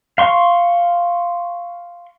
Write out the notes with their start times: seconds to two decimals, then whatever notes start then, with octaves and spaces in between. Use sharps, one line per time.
0.18 F5 C6 C#6